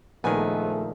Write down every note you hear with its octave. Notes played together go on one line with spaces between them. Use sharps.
A#1 D#3 F3 G#3 A3 B3 B4 G#5